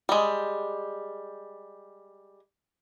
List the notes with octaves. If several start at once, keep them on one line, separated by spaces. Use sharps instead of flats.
G3 G#3